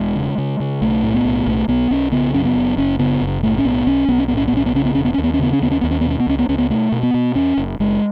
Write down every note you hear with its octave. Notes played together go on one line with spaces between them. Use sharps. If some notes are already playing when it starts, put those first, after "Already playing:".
Already playing: E1 G#3
C#3
C#3
C#3
B1 A3
A2
B3
B1
B1 A3
B1 B3
B1 C#4
C#3 B3
F#2 C#4
B3
F#1
F#1 C#4
C#3 B3
F#1
A2 A3
C#4
B1 B3
B1 C#4
B1 B3
C#4
A2 B3
C#4
B3
B1 C#4
B3
C#3 C#4
B3
E1 C#4
B3
D#2 C#4
B3
C#4
C#3 B3
C#4
D#2 B3
C#4
D#2 B3
C#4
B2 B3
C#4
B3
C#2 C#4
B3
C#2 C#4
B3
B2 A3
B2
B3
B2
E2 C#4
F#1
F#1 G#3